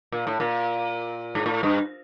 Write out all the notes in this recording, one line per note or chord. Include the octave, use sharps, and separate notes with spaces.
A#2
A2
A#2
G#2
A2
G2